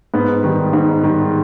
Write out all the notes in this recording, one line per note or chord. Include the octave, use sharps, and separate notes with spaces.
G#2 B3
D#3 G3
G#2
D#3 G3